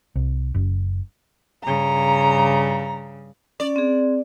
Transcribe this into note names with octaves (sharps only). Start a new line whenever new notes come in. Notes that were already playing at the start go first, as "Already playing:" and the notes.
C2
F#1
G2 C#3 A#5
C#4 D5
C4 G#4